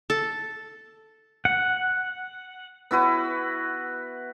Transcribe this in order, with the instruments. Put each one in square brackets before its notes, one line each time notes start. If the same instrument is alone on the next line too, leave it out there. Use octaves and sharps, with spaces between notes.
[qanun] A4
[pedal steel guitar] F#5
[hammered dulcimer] B3 E4 F#4 B4